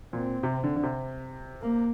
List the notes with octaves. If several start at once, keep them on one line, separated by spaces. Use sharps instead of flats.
A#2 C4
C3
D3
D3
C3
A#3